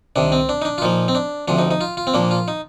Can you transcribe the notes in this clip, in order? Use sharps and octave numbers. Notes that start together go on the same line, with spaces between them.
C2 C3 D#3 D4
C4
D4
D#4
D4
F4
A#2 F3 A#3 D#4
C4
D4
D2 C3 F3 D4
D#4
D#4
F4
F4
C4
A#2 F3 A#3 D4
F4
D#4